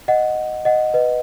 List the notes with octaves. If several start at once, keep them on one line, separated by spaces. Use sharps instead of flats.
D#5 F#5
D#5 F#5
B4 D#5